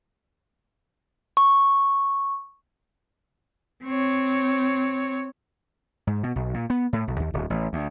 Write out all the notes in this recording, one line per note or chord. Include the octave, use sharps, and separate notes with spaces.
C#6
C4 C#5
G#2
B2
B1
A#2
B3
A2
B1
D#2
D1
A1
D2